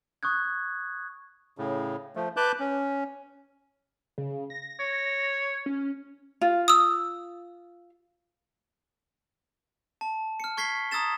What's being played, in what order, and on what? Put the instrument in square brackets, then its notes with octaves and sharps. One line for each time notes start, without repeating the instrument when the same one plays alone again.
[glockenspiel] C#6 D#6 F#6 G#6
[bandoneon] A2 C#3
F3 A3
B4 A5 D6 F#6 G6
C#4
[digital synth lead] C#3
A#6
[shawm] C#5
[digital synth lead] C#4
[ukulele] F4
[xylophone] D#6 E6
[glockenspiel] A5
F6 C#7
C#6 G#6 B6 C7 G7
A#5 D#6 E6 G#6 A6 E7